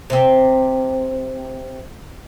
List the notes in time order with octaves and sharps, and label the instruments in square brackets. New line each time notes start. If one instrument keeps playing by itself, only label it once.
[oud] C3 C4